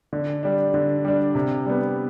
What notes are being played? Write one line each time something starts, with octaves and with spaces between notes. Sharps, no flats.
D3
G3 D4
D3
G3 D4
C3
G3 B3